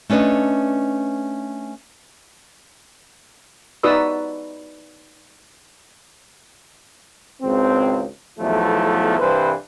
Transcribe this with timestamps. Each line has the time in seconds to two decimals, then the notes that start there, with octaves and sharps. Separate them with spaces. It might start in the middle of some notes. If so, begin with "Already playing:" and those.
0.10 A3 C#4 D4 B4 D#5
3.83 D#4 F#4 B4 D5 D#6 E6
7.42 G#1 C#2 C4
8.39 B1 E2 F3 A3 E4
9.19 C2 G2 E3 B4 C5